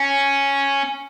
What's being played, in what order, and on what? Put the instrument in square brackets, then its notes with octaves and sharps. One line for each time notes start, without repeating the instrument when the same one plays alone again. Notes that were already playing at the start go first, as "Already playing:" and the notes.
Already playing: [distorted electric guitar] C#4